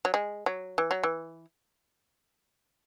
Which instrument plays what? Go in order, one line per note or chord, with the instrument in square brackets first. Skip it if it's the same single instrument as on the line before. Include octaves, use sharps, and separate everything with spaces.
[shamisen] F#3
G#3
F#3
E3
F#3
E3